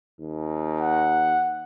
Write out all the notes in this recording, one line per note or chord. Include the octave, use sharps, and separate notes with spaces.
D#2
F#5